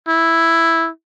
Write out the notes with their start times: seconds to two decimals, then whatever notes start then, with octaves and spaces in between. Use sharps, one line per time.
0.08 E4